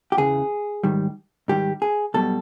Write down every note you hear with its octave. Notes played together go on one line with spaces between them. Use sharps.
G4
E2 C#3 E3 G#4
G#2 D#3 G3
G#2 D#3 G3 G4
G#4
B1 B2 G3 A4